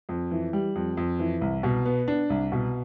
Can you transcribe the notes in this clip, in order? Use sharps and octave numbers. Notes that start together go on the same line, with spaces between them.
F2
E3
G3
F2
F2
E3
C2
B2
B3
D4
C2
B2